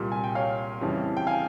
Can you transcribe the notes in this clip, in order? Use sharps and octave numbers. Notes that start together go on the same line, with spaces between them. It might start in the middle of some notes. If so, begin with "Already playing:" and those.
Already playing: C2 A#2 G3
G#5
G5
C#5 F5
F2 C#3 E3 G3
G5
F5 G#5